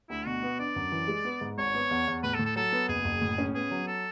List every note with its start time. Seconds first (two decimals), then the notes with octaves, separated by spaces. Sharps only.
0.10 D2 E4
0.26 B2 F#4
0.43 B3
0.59 D4 D5
0.76 F#2
0.92 E3
1.08 G#3
1.25 B3
1.41 G#2
1.58 G#1 C#5
1.74 B3
1.91 E2
2.07 E2
2.23 A2 B4
2.34 A4
2.39 A2
2.45 A4
2.56 F#3 A4
2.72 B3
2.89 F#1 G#4
3.05 F#1
3.21 A2
3.38 C#4
3.54 B3 G#4
3.71 F#3
3.87 A4